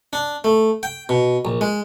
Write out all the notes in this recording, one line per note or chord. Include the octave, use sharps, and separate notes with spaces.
D4
A3
G5
B2
A#1
G#3